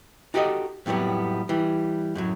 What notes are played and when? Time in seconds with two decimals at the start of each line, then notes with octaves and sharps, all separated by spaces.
0.34 D#4 F#4 G4 A4 D5 D#5
0.86 F2 A2 F#3 G3 B3
1.49 E3 G3
2.15 F#2 A2 F#3